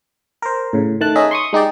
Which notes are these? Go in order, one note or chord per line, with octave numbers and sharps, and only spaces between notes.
A#4 C5
A2 C#3
D#3 A3 A5 F#6
C#4 D#4 G#4 D#5 E5
C6 C#6 D#6
G#3 D#4 G4 D5